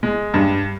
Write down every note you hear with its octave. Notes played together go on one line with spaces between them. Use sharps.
G#3
G2